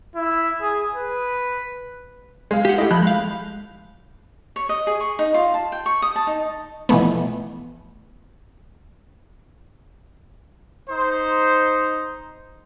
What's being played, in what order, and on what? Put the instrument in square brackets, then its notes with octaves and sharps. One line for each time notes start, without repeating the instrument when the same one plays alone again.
[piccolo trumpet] E4
G#4
B4
[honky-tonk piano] G#3 F5
[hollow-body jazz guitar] G4 F#5
[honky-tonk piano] A3 D#5 [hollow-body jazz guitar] E4 G4
[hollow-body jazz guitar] F3 [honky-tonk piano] B5 F#6 G6
[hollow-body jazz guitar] G#3 F5
[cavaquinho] C#5
D#5
G#4
C#6
D#4
F4
A5
G5
C#6
D#6
A5
D#4
[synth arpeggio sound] B2 E3 F3 A3 B3
[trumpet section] D#4 C5